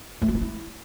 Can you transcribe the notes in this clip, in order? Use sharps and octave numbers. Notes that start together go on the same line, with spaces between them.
A3
F4
D#4
E4